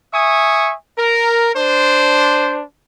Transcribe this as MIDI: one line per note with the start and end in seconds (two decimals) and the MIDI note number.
0.13 0.73 76
0.13 0.73 80
0.13 0.73 85
0.13 0.73 87
0.97 1.51 70
1.56 2.61 62
1.56 2.61 72